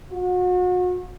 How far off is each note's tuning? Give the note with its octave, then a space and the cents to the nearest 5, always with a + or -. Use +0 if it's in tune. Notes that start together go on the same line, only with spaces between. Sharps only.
F#4 -35